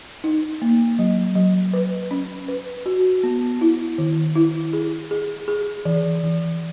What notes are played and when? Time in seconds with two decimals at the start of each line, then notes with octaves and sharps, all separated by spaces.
0.24 D#4
0.62 A#3
0.99 F#3
1.36 F#3
1.73 B4
2.11 C#4
2.48 B4
2.86 F#4
3.23 B3
3.61 E4
3.98 D#3
4.36 E4
4.73 G#4
5.11 G#4
5.48 G#4
5.85 E3
6.23 E3